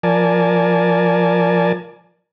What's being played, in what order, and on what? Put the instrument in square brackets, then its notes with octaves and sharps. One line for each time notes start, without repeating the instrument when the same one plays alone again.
[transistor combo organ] F3 A#4 D5 G#5 A5